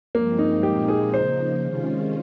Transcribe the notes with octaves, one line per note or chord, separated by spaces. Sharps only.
G2 F3 G#3 A#3 C4
D#4
A#2 F3 G#3 C4 D#4 G4
G#4
C#3 F3 A#3 D#4 C5
C3 D#3 G#3 C#4 F4